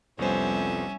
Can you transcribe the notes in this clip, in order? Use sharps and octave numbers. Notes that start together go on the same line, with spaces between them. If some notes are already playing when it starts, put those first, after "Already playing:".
C2 F2 G3 B3 C#4 C5 E5